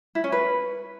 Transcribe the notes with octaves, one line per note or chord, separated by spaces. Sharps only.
E4
C#4
B4